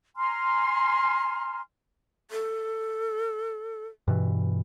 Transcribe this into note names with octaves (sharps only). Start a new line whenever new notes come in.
G#5 A#5 C6 F6
A4
G2 B2 E3